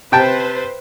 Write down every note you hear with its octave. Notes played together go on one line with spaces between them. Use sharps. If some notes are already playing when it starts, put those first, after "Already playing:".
C3 B4 C5 G5 A5